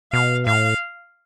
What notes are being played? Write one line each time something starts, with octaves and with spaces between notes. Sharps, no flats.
B2 F5
A2 F5